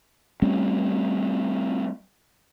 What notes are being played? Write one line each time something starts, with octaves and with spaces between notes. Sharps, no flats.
G3 A3 C4 C#4